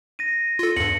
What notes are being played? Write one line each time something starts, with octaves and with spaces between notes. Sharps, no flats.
A#6 D#7
F4 A4
E2 G2 C#7 F#7